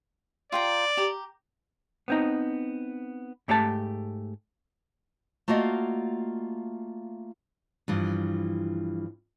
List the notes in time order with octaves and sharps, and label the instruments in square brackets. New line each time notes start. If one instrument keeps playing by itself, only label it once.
[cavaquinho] F4 G5 A#5 [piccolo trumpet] D5
[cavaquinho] G4 A#5
[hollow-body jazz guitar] B3 C4 D#4
G#2 A3 G4 C5 A5
[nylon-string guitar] A3 A#3 F4 F#4 D5 D#5
G2 E3 F3